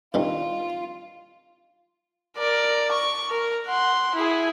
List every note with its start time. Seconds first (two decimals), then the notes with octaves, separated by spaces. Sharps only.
0.14 G2 C3 D#3 F4
2.37 A#4 D5
2.92 C#6
3.30 A#4
3.67 F#5 C6
4.15 E4 G#4